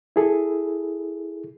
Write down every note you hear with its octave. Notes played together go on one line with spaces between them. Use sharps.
E4 G#4 A4